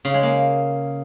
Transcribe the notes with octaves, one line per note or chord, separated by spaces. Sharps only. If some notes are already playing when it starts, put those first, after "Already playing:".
C#3
G#3
A#3